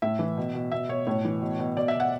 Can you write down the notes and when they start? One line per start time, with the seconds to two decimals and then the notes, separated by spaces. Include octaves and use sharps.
0.02 A2 E5
0.19 E3
0.37 B2
0.54 B2
0.71 B2 E5
0.89 B2 C#5
1.07 A2 C#5
1.25 E3
1.42 B2
1.59 B2
1.76 B2 D5
1.88 E5
1.94 B2
2.00 F#5